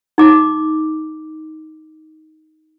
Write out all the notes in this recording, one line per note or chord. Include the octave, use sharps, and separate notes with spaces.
D#4 D6